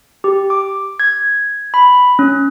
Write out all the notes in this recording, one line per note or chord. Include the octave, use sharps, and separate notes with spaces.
G4
D6
G#6
B5
C#4